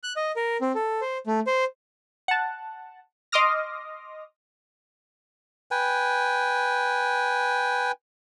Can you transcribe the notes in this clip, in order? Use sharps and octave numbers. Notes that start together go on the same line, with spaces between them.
F#6
D#5
A#4
C4
A4
C5
A3
C5
F#5 A5
D#5 C6 D6 D#6 F6 A#6
B4 G5 G#5